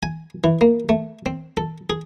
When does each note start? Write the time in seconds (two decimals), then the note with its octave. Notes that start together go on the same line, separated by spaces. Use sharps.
0.03 G#5
0.44 E3
0.61 A#3
0.89 A3
1.26 C4
1.57 A4
1.90 G#4